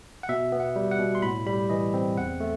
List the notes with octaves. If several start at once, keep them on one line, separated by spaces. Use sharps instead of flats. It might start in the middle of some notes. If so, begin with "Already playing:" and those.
F#5
B2 E5
B3
F#5
G3
F#5
B2
C6
A2 B5
G3 B5
E3 D#5
C4
E2 F#5
A3